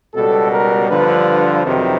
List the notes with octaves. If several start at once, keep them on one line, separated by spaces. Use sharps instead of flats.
C#2 B2 G3 A4
A#4
G2 D3 F3 B4
F2 C3 D#3 F#3 B4